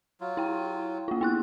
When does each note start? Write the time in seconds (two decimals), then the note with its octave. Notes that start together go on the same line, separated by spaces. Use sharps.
0.21 F#3 F4
0.37 E4 G5
1.08 A#3 F4
1.21 B3 E4 F#6